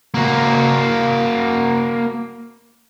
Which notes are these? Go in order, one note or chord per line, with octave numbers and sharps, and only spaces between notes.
A#3 F#4